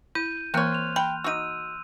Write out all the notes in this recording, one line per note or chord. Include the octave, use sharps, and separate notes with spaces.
E4 G6 D#7
E3 A#3 C4 C#5 C6 F6 F#6
F7
G5 B5
D#4 F#4 E6 D#7